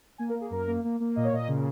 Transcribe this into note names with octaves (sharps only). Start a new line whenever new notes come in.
A#3 G#5
A#4
A#3
G#4
F#2 A#4
A#3
A#3
A#3
A#2 D#5
C#5
A#2 D#5
C#3